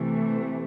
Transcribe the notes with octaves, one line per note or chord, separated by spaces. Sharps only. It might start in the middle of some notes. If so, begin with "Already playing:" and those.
Already playing: C3 E3 A3